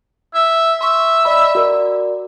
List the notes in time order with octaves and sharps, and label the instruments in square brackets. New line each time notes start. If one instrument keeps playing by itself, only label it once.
[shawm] E5
[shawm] E5 [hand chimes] C6 C#6
[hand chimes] D5 D#5 B5
F#4 A#4 D5